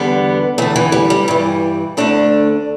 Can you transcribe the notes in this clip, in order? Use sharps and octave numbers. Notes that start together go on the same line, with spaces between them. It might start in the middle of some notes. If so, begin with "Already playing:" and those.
Already playing: E2 D3 G3 B3
E2 D3 E3 A3
E3
G3
G3
G2 E3 G3
D2 D3 A3 D4